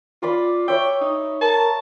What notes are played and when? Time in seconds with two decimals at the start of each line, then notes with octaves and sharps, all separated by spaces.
0.23 F4 D5 B5 D6
0.68 C#5 E5 G5
1.01 D#4
1.41 A#4 A5